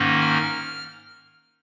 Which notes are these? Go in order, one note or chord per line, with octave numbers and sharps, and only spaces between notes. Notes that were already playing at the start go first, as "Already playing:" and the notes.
Already playing: G#2 D#3 A#3 C#4
F6